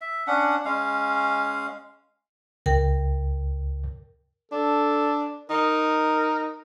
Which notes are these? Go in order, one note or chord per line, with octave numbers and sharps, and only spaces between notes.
E5
C#4 D4 F#5
G#3 C#4 F5
C#2 A#4 G5
D4 A4
D#4 A#4